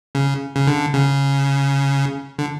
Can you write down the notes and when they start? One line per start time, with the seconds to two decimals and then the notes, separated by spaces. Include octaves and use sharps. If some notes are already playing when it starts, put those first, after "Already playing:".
0.15 C#3
0.56 C#3
0.67 D3
0.94 C#3
2.39 D3